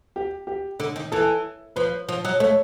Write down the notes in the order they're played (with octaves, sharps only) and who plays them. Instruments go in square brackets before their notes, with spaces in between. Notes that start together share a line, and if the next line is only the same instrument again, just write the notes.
[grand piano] G4
G4
[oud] D3
D#3
[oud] E3 [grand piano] A4
[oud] F3 [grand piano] B4
[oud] F3
F#3
[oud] A3 [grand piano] C#5